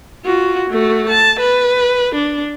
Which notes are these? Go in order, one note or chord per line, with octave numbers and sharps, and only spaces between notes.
F4 F#4
A3 F#4
A5
B4
D4